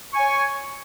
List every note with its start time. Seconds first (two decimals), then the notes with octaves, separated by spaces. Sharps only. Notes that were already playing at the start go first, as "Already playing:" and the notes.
0.12 C#6
0.15 G#5
0.18 C#5